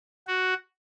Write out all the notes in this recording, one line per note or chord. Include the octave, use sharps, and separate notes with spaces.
F#4